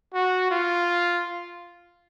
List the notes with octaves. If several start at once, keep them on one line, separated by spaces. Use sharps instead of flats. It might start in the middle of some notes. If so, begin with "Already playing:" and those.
F#4
F4